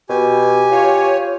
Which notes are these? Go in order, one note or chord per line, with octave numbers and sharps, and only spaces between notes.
B2 G4 G#5
F4 C#5